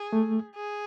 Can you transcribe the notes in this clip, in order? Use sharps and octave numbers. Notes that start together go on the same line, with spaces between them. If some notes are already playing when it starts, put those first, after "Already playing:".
Already playing: G#4
A3
G#4